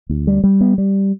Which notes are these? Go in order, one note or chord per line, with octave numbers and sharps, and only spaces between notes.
D2
G3
G3
B3
G3